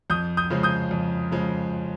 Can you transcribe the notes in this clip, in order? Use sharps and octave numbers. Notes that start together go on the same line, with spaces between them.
F2 D#6 G6
D#6 G6
C#3 F3 G#3
D#6 G6
F2
C#3 F3 G#3